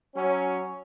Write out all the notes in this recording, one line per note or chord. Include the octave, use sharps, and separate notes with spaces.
F#3 C#4